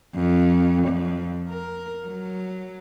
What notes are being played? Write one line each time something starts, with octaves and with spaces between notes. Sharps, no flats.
F2
F2
A#4
F#3